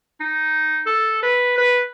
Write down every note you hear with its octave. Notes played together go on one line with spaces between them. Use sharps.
D#4
A4
B4
B4